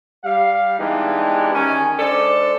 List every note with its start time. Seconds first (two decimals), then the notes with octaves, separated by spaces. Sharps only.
0.25 G3 F5
0.79 E3 G#3 B3 D4 D#4 G4
1.54 D#3 C#4 G#5
1.99 G#3 D4 A4 C5 D5